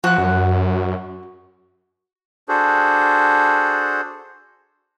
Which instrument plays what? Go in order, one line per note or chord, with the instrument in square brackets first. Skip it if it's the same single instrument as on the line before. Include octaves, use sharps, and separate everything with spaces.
[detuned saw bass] F3 [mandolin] F#4 F#6
[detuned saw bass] F#2
[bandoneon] D4 F#4 G#4 A4 C5